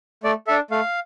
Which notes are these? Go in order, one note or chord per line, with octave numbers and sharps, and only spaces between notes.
A3 D5
D4 A4 E5
A3 F5